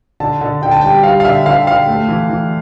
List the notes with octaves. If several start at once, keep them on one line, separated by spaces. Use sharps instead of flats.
D3 A5
D3
D3 G5
A5
G3 G5
G3 F5
F5
D3 E5
D3 F5
D3 F5
A3
E3
E3